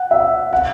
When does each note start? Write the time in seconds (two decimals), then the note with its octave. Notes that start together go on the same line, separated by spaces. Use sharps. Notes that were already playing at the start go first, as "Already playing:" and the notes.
Already playing: F#5
0.11 E5
0.53 F#5